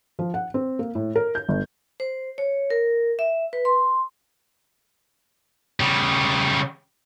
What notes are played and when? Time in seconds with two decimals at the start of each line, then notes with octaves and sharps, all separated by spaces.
0.19 F3
0.34 F#5
0.54 C4
0.79 A#3
0.95 A2
1.16 A#4
1.35 G6
1.48 G1
2.00 C5
2.38 C#5
2.70 A#4
3.19 E5
3.53 B4
3.65 C6
5.80 C#3 G3